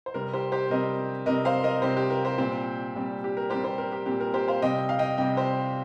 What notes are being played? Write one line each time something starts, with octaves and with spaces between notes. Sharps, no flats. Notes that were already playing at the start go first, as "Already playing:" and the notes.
C5
C3 G3 C4 A#4
G4 C5
G4 C5
C3 G3 C4 A#4 D#5
C3 G3 C4 A#4 D#5
C5 F5
A#4 D#5
C3 G3 C4 G4 C5
G4
A#4
G4 C5
A#2 G3 C4 G4 C5
A#2 G3 C4
G4
A#4
A#2 G3 C4 G4 C5
G4 C5
A#4
G4
A#2 G3 C4 G4
A#4
G4 C5
C5 F5
C3 G3 C4 D#5 G5
F5
D#5 G5
C3 G3 C4 D#5 G5
G4 C5